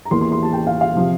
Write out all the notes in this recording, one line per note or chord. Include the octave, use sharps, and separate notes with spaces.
A#5
E2 E3 A#3 C6
C6
C6
A5
G5
F5
F5
C3 F3 C4